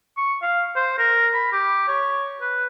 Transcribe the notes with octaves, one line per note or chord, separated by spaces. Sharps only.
C#6
F5
C5
A#4
B5
G4
C#5
B4